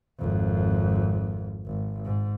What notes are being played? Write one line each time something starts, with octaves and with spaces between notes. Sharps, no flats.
G#1 F2
G#1
G#2